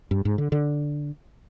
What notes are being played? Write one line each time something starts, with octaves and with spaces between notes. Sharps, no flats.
G2
G#2
D3
D3